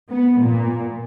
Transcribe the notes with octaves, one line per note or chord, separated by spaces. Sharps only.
B3
A#2